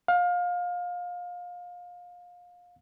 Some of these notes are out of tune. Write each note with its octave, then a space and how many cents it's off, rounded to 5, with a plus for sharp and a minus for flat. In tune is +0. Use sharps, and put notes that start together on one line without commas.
F5 +25